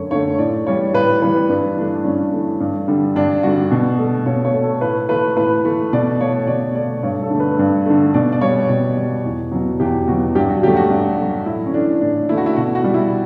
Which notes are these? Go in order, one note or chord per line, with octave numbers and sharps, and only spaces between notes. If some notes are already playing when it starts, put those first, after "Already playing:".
Already playing: F#2 D3 A3 C#5
D3 A3 C#5
A2 D5
E3 G3 C#5
A2 B4
E3 G3 B4
G2 B4
E3 A3 D4
G2 C#4
E3 A3
G2
D3 G3
G2 D4
D3 G3 F#4
B2
A3 A4
B2 C#5
C#5
A3
A4
A2 B4
E3 A3 B4
A2 B4
E3 A3
B2 D5
A3 C#5
B2 D5
A3 D5
G2 C#5
A4
D3 A3
B4
G2
D3 A3
B2 D5
D5
G3 C#5
B2
G3
E2
B2 F#3
E2 G4
B2 F#3 F#4
G2 G4
F#4
F#3 A3 G4
F#4
G2
F#3 A3
A2 E4
C#4
E3 A3 D4
A2 D4
E3 A3 E4
F#4
E4
B2 F#4
F#4
G3
E4